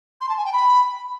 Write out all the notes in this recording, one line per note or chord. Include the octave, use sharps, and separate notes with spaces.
C6
A5
G#5
G5
B5